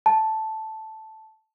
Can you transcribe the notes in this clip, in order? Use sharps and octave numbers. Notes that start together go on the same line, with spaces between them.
A5